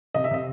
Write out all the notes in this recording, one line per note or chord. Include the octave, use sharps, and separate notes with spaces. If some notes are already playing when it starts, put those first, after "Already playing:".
C3 D#5
E5
C3 D#5